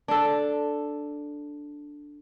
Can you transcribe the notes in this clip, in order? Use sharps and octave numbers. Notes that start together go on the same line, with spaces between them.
D4 A4